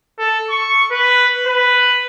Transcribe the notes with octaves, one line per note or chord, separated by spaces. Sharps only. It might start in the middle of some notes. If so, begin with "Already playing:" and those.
A4
C#6
B4
B4